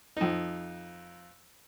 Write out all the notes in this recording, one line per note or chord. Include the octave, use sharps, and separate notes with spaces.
F2 D#4